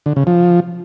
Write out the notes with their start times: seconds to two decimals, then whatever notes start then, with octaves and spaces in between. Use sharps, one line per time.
0.06 D3
0.16 C#3
0.27 F3